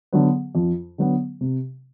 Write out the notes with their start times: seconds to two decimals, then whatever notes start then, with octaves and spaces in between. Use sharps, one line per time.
0.13 D3 F#3 B3
0.55 F2
0.98 D3 F#3 B3
1.41 C3